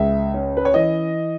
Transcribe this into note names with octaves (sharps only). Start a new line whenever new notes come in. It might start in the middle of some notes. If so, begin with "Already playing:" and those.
Already playing: C#2 G#3 E5
C#4
B4
C#5
E3 D#5